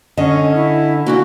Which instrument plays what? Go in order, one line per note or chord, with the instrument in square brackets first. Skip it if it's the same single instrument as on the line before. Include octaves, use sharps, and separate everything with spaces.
[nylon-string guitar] D3 [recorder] C#4 [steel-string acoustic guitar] D#5
[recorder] E4
[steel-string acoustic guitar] D3 E3 A#3 [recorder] F#4